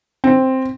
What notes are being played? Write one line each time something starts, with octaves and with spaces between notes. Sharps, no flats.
C4